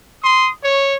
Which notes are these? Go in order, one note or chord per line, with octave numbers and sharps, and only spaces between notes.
C6 D#6
C#5